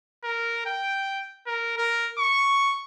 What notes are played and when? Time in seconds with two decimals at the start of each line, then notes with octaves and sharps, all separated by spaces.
0.24 A#4
0.66 G5
1.47 A#4
1.78 A#4
2.18 C#6